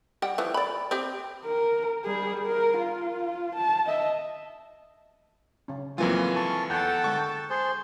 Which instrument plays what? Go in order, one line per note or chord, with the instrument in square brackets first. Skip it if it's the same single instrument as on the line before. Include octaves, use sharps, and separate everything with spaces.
[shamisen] G3 F#5 G5
E3 F3
D5 B5
C4 G4
[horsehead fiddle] A#4
G3 G#4
A#4
F4
A5
D#5 E5
[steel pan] C#3 C#4
[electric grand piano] F2 E3 F4 [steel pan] F#3 G#3 A#3 [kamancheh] G#5
[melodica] A5 C#6
[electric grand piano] E2 [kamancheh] A4 A5 [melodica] F#5 G5
[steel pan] D3 G#3 [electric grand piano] C#6
[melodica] G#4 C5